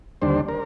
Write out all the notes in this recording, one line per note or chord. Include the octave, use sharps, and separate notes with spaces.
D#2 D3 G3 D4 C5
A#4